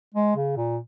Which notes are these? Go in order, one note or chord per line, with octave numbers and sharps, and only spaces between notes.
G#3
C#3
A#2